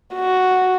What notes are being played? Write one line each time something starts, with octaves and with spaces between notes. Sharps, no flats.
F#4